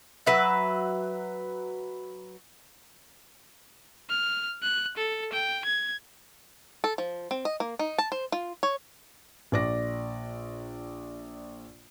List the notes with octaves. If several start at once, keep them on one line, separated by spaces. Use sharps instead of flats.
F#3 B4 E5
F6
F#6
A4
G5
G#6
A4
F3
C4
D#5
A#3
D#4
A5
C5
F4
C#5
A#1 D5 A#6